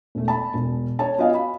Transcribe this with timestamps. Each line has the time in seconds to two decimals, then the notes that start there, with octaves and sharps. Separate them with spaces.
0.15 E1 A3
0.28 A5 B5
0.54 E1
0.99 C#5 A5
1.18 B3 F4 F#4 D#5 F5 G#5
1.34 B5